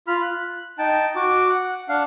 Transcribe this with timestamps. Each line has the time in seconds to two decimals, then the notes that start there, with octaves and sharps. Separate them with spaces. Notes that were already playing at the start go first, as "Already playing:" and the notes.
0.08 F4 B5 F6
0.22 F#6
0.79 D#4 G5 A5
1.16 F#4 D6
1.49 F#5
1.89 D4 F5 F#5